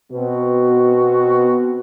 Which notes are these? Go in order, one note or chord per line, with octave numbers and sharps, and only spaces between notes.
B2 B3 C4 F#4